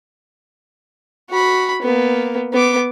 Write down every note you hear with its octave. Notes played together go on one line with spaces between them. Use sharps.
F#4 B5
A#3 B3
B3 D6